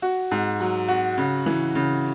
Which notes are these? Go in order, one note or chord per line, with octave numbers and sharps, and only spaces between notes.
F#4
G#2
F#3
F#4
C#3
E3
C#3